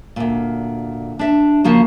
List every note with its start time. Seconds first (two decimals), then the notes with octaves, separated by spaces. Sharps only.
0.16 D2 A#2
1.19 D4 E5
1.64 C#3 F3 A#3 F#4